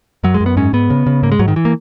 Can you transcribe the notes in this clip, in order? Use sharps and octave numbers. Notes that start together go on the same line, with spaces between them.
F#2 F#3
G#3
F#2
B3
G#2 C#4
G#2 B3
C#3
C#3
G#2 A#3
G#3
G#2 F#3
D#3
E3
A#3